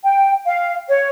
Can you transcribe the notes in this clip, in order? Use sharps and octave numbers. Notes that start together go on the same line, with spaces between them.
G5
F5
C#5